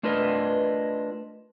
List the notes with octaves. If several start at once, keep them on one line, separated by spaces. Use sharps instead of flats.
A3 D4 F4 A#4 B4 D#5